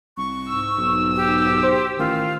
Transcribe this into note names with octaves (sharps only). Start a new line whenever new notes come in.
C2 C#6
G#2 E6
B1
G4
C5
A1 D#3 F4